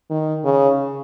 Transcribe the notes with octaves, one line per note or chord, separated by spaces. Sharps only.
D#3
C#3